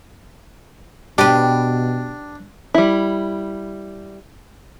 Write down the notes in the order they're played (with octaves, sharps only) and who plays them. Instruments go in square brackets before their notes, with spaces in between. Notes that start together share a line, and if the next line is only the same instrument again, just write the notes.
[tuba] B2 [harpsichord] D4 [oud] G4 B4
[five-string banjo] G3 E4